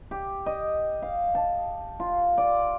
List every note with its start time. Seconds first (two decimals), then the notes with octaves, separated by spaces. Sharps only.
0.11 G4
0.46 D#5
1.02 F5
1.35 A5
2.00 F4
2.38 D5